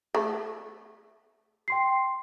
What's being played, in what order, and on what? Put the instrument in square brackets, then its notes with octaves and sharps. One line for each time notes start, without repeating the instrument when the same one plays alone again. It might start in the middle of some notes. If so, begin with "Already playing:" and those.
[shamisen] A3
[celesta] G5 C6 C7